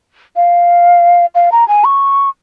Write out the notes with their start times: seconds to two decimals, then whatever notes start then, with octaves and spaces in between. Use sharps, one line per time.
0.36 F5
1.35 F5
1.52 A#5
1.68 G#5
1.84 C#6